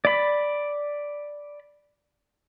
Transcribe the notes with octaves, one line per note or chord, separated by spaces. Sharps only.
D5 B5